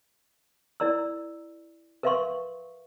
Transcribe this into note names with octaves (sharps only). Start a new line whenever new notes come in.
E4 A#4 D5 A#5 E6
A#4 B4 E5 F5 C6 C#6